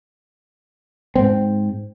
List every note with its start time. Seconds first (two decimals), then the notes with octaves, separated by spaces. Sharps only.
1.16 G#2 C4